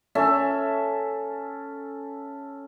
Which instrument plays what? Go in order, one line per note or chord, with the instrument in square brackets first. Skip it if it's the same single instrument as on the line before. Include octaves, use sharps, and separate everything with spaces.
[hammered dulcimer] C#4 A4 E5